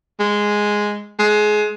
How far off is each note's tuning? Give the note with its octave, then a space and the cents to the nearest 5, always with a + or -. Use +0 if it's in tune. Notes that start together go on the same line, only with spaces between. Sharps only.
G#3 -5
G#3 +20